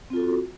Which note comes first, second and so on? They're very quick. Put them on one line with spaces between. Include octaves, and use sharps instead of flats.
C4 F4 A4 F#4